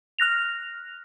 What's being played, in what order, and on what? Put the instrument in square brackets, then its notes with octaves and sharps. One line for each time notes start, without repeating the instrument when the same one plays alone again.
[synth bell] F6 F#6 A#6 F7